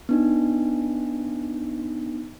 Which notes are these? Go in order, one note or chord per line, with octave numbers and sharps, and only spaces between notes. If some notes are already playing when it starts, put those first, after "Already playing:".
B3 D4 D#4